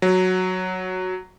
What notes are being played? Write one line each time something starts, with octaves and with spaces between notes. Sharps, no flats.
F#3